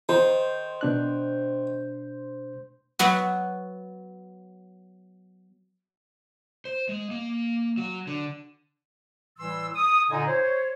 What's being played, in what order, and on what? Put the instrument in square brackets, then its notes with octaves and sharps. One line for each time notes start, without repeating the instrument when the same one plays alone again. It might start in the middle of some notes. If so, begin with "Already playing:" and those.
[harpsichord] D#3 [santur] C5
[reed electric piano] B2 D4 F#6
[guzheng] F#3 B3 F#4
[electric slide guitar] C5
G#3
A#3
F#3
D3
[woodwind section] A2 E3 G3 C6 E6
D#6
A#2 D3 D#4 G#5
C5 C#5